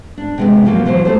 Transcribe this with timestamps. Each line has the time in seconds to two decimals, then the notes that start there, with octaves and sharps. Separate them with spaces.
0.18 D4
0.38 C3 G#3 B3
0.65 B2 F3 F#3 A#3 B3
0.86 E3 F#3 B3 E4 C5
1.05 A3 E4 A4 C5